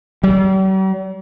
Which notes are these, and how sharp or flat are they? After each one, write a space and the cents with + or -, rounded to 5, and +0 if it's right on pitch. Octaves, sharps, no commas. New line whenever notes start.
G3 -45